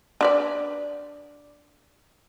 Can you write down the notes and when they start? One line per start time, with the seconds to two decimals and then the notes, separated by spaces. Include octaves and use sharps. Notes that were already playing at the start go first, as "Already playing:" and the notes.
0.21 D4 B4 D5